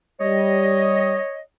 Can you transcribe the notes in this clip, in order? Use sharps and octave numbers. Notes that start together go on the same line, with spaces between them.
G3 C#5 D#5